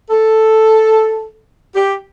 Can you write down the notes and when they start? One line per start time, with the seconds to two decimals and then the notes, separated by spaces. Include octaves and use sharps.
0.10 A4
1.75 G4